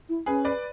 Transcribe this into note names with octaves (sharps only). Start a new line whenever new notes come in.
E4
C#4 G#4 B4
B4 D5